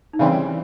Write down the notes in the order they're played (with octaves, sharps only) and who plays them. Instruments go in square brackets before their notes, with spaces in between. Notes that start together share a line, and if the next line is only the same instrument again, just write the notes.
[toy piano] D#4
[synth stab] C#3 E3 G3 C4 [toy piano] D4